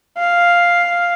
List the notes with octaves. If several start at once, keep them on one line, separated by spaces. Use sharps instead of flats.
F5